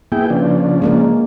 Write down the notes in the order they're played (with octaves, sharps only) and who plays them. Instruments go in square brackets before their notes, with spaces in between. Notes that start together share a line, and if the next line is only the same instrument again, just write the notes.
[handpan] A#3 B3 [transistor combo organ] E4 G#4 G5
[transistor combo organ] C#3 F3 D4
[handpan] G#3 A#3 A#4